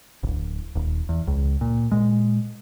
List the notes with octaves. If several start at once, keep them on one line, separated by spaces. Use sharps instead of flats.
D1 G1
D#1
E2
C#2
A#2
A#2 G#3